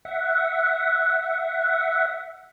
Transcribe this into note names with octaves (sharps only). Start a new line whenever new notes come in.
E5 F#5